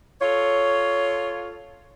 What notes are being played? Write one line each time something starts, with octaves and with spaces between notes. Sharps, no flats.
F4 A4 C#5